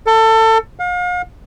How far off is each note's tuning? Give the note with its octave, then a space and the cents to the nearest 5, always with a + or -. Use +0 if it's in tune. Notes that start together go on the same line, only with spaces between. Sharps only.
A4 +25
F5 +40